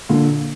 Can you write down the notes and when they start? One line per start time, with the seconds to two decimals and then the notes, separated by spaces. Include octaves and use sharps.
0.09 A#2 D3